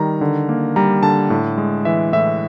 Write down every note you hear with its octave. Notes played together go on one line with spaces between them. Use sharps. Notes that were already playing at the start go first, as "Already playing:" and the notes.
Already playing: D#3 G3 A#5
D3
A#3
G3 A#5
D3 A5
A2
G#3
E3 E5
A2 E5